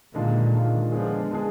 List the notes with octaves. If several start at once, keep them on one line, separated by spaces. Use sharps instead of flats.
A#2 D3 D#3 G#3 D4 F4
D#3 G#3 D4 F4
D3 F3 G#3 B3 D4 G#4
G#3 B3 D4 G#4